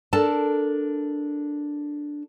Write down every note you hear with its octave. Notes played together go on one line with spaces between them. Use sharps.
D4 A4 A#4 A5